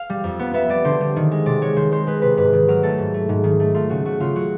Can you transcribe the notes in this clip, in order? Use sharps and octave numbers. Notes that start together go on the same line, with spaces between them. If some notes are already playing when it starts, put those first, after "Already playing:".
Already playing: F5
G3
F2
B3
B3 E5
G3 D5
D3 C5
G3
D#3
G#3
C3 D5
G#3 C#5
D#3 C5
G#3 C5
G#3 B4
C3 B4
G#2 B4
D#3
F#3 A#4
A3 A4
G#2
A3
G#2
D#3
A3
A3 F4
C#3 F#4
A3 F#4
C#3 F4
F#3 F#4